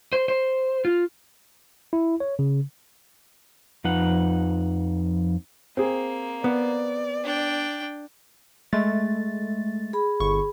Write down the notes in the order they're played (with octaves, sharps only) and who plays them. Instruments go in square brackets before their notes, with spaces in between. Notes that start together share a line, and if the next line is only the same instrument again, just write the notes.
[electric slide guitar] C5
C5
F4
[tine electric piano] E4
C#5
C#3
[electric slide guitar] F2 F3 D#4 B4 F#5
[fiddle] A#3 [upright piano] C4 G#4
[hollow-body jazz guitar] B3 [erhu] D5
[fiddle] D4 G5
[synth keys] G#3 A3 A6
[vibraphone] G#4 B5
[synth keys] G1 C#6